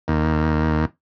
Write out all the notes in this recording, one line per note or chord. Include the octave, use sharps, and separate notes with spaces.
D#2